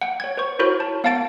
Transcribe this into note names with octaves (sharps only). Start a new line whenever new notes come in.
F#5 G5
C#5 G#6
B4 C5 C#6
E4 F#4 A#4 C5 C#5
A5
B3 F5 F#5 A5 A6 D7